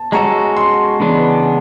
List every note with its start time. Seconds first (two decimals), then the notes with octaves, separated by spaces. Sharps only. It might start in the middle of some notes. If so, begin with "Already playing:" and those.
Already playing: A5
0.12 G#3 C#4 F#4 A4 A#5
0.57 C6
1.00 C#3 E3 G#3 B3 D4